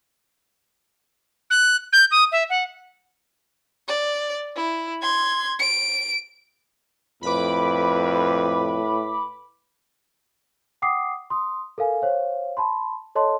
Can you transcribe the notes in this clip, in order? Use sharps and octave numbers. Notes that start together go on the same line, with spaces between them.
F#6
G6
D#6
E5
F#5
D5
E4
C6 G#6
D7
F2 A2 B4 B5 D6
F#5 G5 D6 D#6 C7
C6 D#6
A4 A#4 F5 G#5
C5 C#5 F5
A5 B5 C6
A4 C#5 D#5 A5 C6